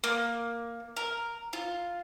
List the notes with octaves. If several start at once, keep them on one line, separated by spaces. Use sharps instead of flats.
A#3
A#4
F4